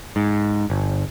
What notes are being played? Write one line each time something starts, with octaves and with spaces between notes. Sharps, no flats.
G#2
G1